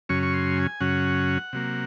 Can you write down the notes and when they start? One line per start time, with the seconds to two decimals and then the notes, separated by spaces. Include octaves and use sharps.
0.09 F#2 C#3 F#3 C#4 C#6
0.23 C#6
0.33 C6
0.57 G#5
0.81 F#2 C#3 F#3 C#4 F#5
1.53 C3 F#3 A#3